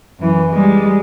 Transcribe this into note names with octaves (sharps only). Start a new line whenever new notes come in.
F#2 E3
G3 G#3